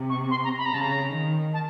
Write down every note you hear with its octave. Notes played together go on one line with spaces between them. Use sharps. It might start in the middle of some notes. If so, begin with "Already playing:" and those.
Already playing: C3
C#6
C6
A#5
B5
A#5
C#3 A5
A#5
D#3
A5